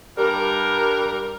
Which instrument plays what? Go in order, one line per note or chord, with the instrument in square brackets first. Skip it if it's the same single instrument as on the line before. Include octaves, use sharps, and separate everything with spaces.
[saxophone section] G2 G3 A#4